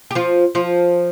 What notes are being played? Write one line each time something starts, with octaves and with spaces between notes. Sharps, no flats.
G4
F3 F4
F3 F4